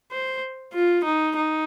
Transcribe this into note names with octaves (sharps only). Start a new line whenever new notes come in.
C5
F4
D#4
D#4